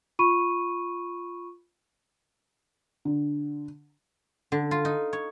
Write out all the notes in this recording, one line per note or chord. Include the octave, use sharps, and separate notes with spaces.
F4 B5 C#6 D#7
D3
D3
F4
D#4
C#5